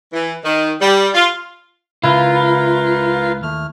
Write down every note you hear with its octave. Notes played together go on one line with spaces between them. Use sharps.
E3
D#3
G3
F4
C#2 C#3 E4 F4 A#4 B4
D#2 A3 F6